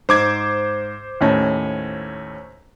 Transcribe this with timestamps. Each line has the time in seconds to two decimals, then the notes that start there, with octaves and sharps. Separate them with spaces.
0.09 G#2 C5 D6 G#6
1.21 D#2 A2 C#4